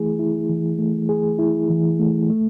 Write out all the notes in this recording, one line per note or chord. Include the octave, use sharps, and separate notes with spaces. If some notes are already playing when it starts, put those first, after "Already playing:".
Already playing: E3 A3 E4 G#4
E4
E3
A3
G#4
E4
E3
A3
A3